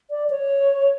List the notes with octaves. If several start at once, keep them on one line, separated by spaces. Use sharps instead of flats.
D5
C#5